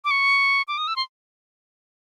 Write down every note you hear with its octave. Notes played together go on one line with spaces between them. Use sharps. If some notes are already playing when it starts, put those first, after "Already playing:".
D6
C#6
D6
D#6
E6
C6